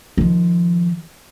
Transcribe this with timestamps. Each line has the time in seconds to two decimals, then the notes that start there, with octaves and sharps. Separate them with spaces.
0.17 D#3 F3